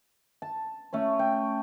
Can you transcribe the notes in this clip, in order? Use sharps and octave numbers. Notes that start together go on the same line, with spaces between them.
A5
A3 C#4 C#5
G5